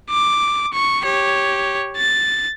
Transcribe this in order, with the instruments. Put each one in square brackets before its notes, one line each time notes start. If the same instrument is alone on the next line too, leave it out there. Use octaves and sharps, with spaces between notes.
[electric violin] D6
C#6
G4 C#5
A6